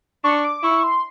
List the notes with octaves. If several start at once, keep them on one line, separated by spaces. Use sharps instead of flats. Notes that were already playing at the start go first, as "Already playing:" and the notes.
D4 C#6
D6
E4 C#6
C6